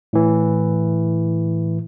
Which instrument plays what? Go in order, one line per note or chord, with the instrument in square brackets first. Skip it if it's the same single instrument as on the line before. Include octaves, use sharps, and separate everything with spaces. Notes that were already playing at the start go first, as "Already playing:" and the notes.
[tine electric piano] A2 E3